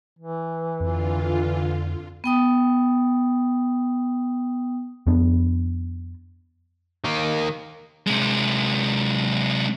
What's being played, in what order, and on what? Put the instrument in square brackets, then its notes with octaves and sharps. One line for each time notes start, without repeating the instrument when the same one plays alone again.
[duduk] E3
[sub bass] F2 [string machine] D3 F4
[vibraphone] B3 G5 D#6
[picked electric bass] F2 B3 D4
[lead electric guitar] D#3 A#3
C3 G#3